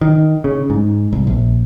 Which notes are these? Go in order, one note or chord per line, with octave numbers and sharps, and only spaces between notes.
D#3
C#3
G#2
C2
A#1